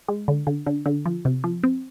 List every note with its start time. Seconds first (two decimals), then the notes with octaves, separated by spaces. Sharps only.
0.08 G#3
0.28 D3
0.47 D3
0.67 D3
0.86 D3
1.06 F3
1.25 C3
1.44 F3
1.63 C4